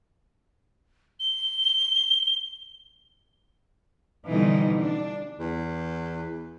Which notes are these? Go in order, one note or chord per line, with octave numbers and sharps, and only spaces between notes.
G7
B2 D3 E3 F3 G3 D#4
D4
E2